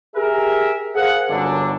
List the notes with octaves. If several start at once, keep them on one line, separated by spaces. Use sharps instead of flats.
G4 G#4 A#4 E5
G#4 A#4 C5 F5 F#5
G1 F#2 D3 D4